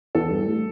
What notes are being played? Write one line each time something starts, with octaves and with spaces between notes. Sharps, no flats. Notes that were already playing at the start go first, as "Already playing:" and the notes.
E2 A4
G2
A2